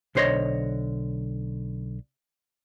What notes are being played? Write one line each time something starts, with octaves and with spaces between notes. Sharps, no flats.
B1 D3 C5 C#5 D#5